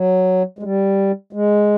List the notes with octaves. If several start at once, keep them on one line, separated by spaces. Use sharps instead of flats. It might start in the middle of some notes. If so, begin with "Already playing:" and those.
Already playing: F#3
G#3
G3
G#3